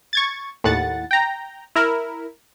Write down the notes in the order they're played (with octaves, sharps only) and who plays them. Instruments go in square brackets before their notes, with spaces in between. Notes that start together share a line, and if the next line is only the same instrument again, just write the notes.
[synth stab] C#6 G#6 A6
D#2 A2 F#5 A6
G5 A#5
E4 A#4